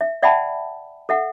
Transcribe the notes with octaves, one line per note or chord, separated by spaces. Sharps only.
E5
D5 E5 F#5 G5 A5 B5
A4 E5 F#5